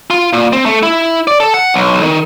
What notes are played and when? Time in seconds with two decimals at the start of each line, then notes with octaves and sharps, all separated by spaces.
0.10 F4
0.33 A#2
0.53 C4
0.66 A3
0.83 E4
1.27 D5
1.40 A4
1.54 F#5
1.74 B1
2.03 D#3